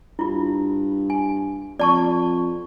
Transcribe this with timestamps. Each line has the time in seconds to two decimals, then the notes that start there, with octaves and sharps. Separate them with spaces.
0.19 G2 E4 F4
1.10 G#5
1.80 F2 D5 A5 C#6